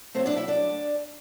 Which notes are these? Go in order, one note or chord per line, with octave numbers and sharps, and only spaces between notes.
A2 F#3 A3 C4 C5
D4 D5
E4 E5
D4 D5